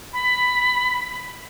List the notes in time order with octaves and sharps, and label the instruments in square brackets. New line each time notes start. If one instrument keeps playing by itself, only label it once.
[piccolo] B5